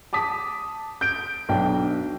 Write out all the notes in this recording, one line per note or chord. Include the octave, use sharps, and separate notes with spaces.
A5 D6 D#6 B6
G6 D7
B1 D4 G5